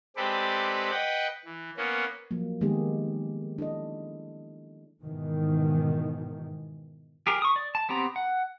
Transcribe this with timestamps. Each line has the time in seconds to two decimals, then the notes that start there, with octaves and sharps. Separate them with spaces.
0.16 G#3 C4 G4 A4 B4 D5
0.91 B4 D#5 F#5 G5
1.45 E3
1.77 A#3 B3 C#4
2.31 F3 F#3 A#3
2.61 D#3 G#3 A#3 B3 G4 G#4
3.58 D4 E4 A4 D#5
5.03 G#2 B2 D#3 E3
7.27 G4 G#4 A#4
7.42 C#6 D#6
7.56 D5
7.75 A5
7.89 B3 C4 G4 A#5
8.16 F#5